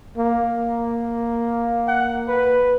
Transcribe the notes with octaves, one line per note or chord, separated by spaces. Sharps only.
A#3
F#5
B4